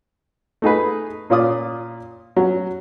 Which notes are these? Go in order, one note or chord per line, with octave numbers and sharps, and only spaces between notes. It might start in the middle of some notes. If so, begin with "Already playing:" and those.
A3 D#4 G#4 B4
A#2 C#4 F4 D5 D#6
F#3 C#4